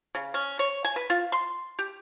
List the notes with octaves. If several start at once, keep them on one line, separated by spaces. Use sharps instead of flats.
C#3
C#4
C#5
G#5
B4
F4
C6
G4